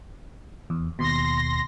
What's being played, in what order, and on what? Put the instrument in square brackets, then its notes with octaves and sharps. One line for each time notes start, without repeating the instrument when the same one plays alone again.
[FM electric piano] E2
[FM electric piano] D#2 B2 [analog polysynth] C6 A#6